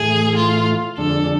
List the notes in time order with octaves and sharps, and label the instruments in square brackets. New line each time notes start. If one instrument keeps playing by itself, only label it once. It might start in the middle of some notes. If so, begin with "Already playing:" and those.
Already playing: [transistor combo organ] A2 E3 A3 [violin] G#4
[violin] F4
[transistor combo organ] F2 D3 G#3 D4 [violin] A4